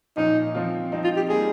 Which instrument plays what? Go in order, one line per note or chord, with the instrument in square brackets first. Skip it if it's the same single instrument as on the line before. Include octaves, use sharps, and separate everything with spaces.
[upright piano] A#2 F3 A#3 C#4 F4 [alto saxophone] D#4
[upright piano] F3 C4 F4
F3 C4 D#4
[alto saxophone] F4
G4
[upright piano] G3 A#3 D#4 [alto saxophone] G#4